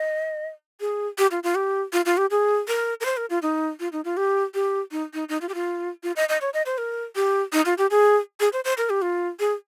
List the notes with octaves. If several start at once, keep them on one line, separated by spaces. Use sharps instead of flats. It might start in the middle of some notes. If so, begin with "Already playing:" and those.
Already playing: D#5
G#4
G4
F4
F4
G4
F4
F4
G4
G#4
A#4
A#4
C5
A#4
F4
D#4
F4
D#4
F4
G4
G4
D#4
D#4
D#4
F4
G4
F4
F4
D#5
D#5
C#5
D#5
C5
A#4
G4
D#4
F4
G4
G#4
G#4
C5
C5
A#4
G4
F4
G#4